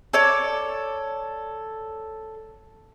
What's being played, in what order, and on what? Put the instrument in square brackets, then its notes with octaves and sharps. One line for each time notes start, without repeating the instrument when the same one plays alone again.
[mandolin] A4 C#5 D5